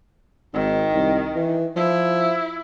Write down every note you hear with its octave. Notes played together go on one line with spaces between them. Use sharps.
G#1 D#3
C2
E3
F3 E4